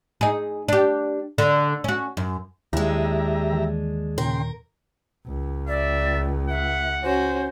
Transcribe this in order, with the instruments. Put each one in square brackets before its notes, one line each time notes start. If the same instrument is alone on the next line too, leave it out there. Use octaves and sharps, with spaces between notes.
[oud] D#4 G#4
D4 G4
D3
C#4 F#4
F#2
[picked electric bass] D#2 [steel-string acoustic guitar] G#3 D4 [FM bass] E4 [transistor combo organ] G4 E5 A#5
[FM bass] E3
[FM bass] A#2 [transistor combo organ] C#3 G5 C6 [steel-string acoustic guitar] A#4
[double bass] C#2
[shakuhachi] D5 [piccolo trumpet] E5
[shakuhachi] E5 [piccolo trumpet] F#5
[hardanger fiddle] C#4 F#4 [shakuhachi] C5